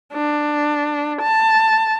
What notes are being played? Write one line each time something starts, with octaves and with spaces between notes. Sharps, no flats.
D4
A5